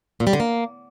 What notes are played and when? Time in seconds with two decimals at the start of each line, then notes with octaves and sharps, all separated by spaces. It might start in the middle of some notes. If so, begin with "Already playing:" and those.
0.20 A#2
0.27 G3
0.33 D3
0.40 A#3